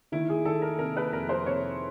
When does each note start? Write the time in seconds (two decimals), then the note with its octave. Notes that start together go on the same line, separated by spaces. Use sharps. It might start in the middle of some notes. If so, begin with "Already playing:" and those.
0.12 D#3 E4
0.30 G#4
0.45 D#3 A4
0.62 A#4
0.79 C3 A#4
0.97 B4
1.13 F2 A#4
1.29 C5
1.46 C3 C#5